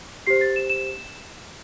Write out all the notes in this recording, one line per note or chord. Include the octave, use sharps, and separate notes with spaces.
G4 C5 C7
A6
E7
E7